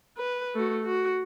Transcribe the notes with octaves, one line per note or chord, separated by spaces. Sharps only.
B4
A3 F#4
F#4